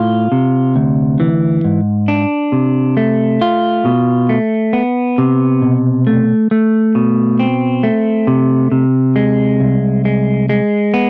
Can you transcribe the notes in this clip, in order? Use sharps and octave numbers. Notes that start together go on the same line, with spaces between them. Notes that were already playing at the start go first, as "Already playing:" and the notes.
Already playing: A2 F4
C3
D2
E3
G#2
D4
C3
A3
F4
B2
A3
B3
C3
B2
A3
A3
B2
C4
A3
C3
C3
G#3
C2
G#3
G#3
B3